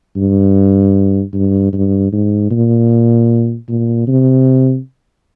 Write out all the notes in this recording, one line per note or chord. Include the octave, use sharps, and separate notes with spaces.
G2
G2
G2
G#2
A#2
A#2
C3